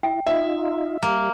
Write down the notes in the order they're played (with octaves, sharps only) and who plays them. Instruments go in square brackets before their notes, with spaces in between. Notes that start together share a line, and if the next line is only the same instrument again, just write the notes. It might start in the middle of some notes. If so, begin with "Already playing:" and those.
[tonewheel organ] E4 [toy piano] G5
[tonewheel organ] D#4 F4 [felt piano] E5
[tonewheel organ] G3 [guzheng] A#3